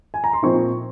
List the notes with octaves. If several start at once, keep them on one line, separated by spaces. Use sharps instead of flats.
G#5
A#5
C6
A#2 F3 C4 D#4 C#6